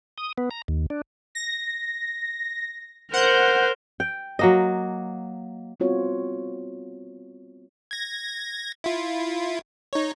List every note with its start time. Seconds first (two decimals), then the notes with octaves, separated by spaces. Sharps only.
0.18 D#6
0.38 B3
0.51 A#5
0.68 D#2
0.90 D4
1.35 A#6
3.13 A#4 C5 F#5 G6
4.00 G5
4.39 F#3 A#3 D#5
5.80 G3 B3 C4 F4 F#4 C#5
7.91 G#6 A#6
8.84 E4 F4
9.93 D#4 C#5